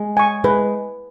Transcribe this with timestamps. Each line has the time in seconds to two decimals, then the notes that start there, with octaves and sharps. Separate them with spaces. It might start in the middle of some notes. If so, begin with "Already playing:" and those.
Already playing: G#3
0.17 G#5 C#6
0.44 G#3 B4